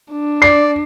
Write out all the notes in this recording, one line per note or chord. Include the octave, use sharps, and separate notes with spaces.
D4
D5 C7